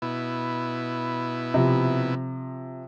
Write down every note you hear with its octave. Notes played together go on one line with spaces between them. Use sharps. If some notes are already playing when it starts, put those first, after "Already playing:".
B2 E4
C3 F3